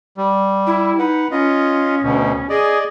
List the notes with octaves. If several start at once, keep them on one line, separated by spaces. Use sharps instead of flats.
G3
E4
D#4 B4 F#5
C#4 F4 D#5
D2 B2
G#4 D5 D#5